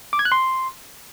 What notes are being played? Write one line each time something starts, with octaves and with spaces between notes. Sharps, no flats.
D6
G#6
F#6
C6